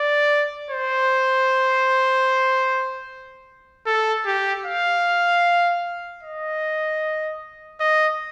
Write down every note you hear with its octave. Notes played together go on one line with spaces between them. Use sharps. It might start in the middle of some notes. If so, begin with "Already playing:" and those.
Already playing: D5
C5
A4
G4
F5
D#5
D#5